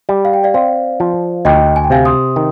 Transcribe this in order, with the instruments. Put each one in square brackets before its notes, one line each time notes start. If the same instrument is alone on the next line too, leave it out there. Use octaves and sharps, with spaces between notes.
[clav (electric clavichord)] G3
[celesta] F5
G5
D5 F5
[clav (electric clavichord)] C4 [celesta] D5 F5
[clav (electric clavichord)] F3
[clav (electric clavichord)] D2 [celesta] D#5 G5
[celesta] G#5
G5
[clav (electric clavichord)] C3 [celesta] F5 G#5
[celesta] C6 D#6
[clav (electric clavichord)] D#3